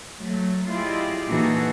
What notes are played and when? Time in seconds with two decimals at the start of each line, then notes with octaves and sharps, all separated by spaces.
0.22 F#3 A3
0.71 E4 F4 G4 G#4 D5 D#5
1.27 A#2 E3 D#4 F#4 G#4 A4